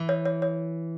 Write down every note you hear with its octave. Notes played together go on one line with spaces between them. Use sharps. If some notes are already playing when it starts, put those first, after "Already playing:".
Already playing: E3
C#5
C#5
C#5